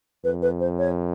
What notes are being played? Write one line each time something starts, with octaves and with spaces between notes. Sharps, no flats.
F2 B4
B4
C5
C#5